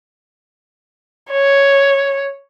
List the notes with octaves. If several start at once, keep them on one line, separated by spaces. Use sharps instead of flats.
C#5